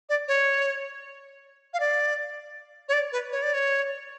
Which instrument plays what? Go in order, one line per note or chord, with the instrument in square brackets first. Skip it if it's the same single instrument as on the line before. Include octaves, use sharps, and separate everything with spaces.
[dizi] D5
C#5
F5
D5
C#5
D5
B4
C#5
D5
C#5